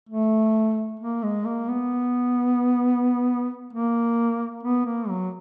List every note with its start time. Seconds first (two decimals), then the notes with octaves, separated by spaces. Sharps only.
0.09 A3
1.00 A#3
1.23 G#3
1.45 A#3
1.68 B3
3.73 A#3
4.63 B3
4.86 A#3
5.09 F#3